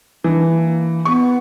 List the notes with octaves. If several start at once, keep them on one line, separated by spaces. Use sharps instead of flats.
E3 D4
A#3
B3 C#6